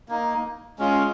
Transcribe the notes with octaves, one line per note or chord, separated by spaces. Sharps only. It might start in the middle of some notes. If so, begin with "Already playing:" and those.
A#3 D#4
G#3 C#4 F4